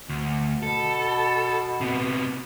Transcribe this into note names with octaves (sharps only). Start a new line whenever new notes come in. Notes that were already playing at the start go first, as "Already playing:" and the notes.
D2
B2 A4
C3 B3